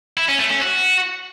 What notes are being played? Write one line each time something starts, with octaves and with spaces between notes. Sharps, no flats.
E4
C#4
A3
C#4
F#4